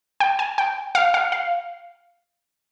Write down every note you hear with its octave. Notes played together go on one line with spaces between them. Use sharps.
G5
G#5
G5
F5
F5
F5